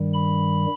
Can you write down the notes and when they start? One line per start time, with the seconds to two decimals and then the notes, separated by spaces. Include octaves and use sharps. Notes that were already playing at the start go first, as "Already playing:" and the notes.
Already playing: G2 D#3 G3
0.14 B5